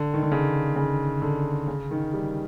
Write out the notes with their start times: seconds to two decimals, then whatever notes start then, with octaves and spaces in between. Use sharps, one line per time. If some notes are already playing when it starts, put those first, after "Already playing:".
Already playing: D3
0.14 D#3
0.23 D3
0.32 C#3
0.76 C#3
1.22 D3
1.68 C#3
1.91 D#3
2.14 G3